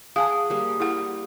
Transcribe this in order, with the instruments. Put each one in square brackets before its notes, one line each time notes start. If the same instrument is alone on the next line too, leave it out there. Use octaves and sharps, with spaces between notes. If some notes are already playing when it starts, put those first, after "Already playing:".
[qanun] G#4 F#5 [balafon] F5 G#5 A5 [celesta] D#6
[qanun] G3 A#3
[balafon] E4 G#4 F#5